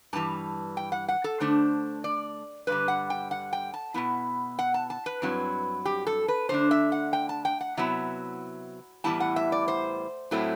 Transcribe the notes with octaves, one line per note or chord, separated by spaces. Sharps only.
G2 E3 G3 A5
G5
F#5
F#5
A4
D3 A3 D4 C5
D5
G2 D3 G3 B4
F#5
G5
F#5
G5
A5
B2 G3 B3 E4
F#5
A5
A5
B4
G2 F#3 C4 E4
G4
A4
B4
D3 A3 D4 C5
E5
F#5
G5
A5
G5
F#5
C3 F#3 B3 E4 E5
A2 E3 G3 B3 E4 A5
F#5
E5
D5
C5
A2 F#3 A3 C4 E4